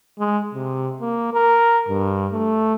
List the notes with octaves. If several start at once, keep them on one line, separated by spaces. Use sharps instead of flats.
G#3
C3
A#3
A#4
G2
A3